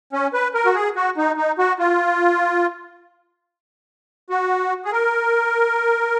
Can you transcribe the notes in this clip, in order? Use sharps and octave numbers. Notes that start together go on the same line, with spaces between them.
C#4
B4
A#4
F#4
G#4
F#4
D#4
D#4
F#4
F4
F#4
G#4
A#4